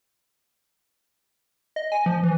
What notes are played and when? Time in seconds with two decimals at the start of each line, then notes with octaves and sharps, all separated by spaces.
1.76 D#5
1.92 G#5
2.06 F3
2.23 E3